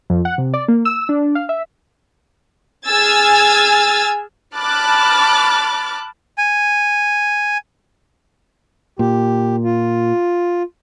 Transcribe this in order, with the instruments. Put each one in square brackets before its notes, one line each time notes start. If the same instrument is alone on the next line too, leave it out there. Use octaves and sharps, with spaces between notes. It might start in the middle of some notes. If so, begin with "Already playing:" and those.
[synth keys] F2
F#5
C3
D5
A#3
E6
D4
F5
E5
[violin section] G#4 G#5 E6 F6 G#6 A6
[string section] A5 B5 D6 F6 F#6 A6
[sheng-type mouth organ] G#5
[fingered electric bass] A#2 [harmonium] G4
[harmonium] F4